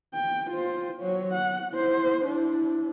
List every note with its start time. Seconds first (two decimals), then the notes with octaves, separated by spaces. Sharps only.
0.14 G5
0.50 F4 C5
1.01 F#3 C#5
1.33 F#5
1.73 E4 C5
2.23 D4 E4